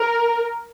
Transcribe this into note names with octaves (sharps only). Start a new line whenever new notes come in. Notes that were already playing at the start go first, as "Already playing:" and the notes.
Already playing: A#4